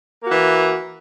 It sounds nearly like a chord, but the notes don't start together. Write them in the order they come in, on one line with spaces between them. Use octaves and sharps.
A#3 F#4 E3